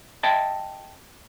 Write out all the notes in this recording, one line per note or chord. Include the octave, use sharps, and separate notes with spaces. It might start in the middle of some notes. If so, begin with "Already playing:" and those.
D#5 E5 G5 A5